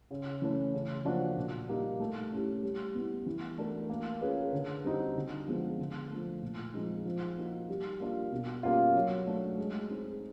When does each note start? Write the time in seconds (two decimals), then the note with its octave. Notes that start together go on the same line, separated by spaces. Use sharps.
0.11 C#3
0.42 E3 A3 C#4
0.74 C#3
1.05 F3 A#3 D4 F#4
1.37 A#2
1.69 G3 A#3 D#4
2.00 A3
2.32 C#4 E4 G4
2.63 G3
2.95 B3 E4
3.26 E3
3.58 A3 D4 F#4 A#4
3.90 A#3
4.21 C#4 F4 G#4 B4
4.53 D3
4.84 G3 C4 D#4 F#4
5.16 D3
5.48 F3 G#3 B3
5.79 D3
6.11 F3 A3
6.42 A#2
6.74 F3 G#3 C4 D#4
7.05 F3
7.37 A#3 D#4 F#4
7.69 G3
8.00 A#3 D4 F4
8.32 B2
8.63 G3 A#3 C#4 F4
8.95 F#3
9.27 A3 D4
9.58 G#3
9.90 C4 D#4 G#4